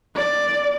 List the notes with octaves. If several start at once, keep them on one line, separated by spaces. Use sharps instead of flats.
D5